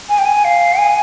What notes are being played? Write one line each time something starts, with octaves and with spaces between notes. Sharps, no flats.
G#5
G5
G#5
F5
G#5